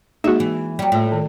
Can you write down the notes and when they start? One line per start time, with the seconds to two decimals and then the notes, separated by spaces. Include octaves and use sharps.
0.24 G#3 A#3 D#4 F#4 G#4 E5
0.40 E3
0.79 F#3 G3
0.92 A2 A3 F4
1.12 D#3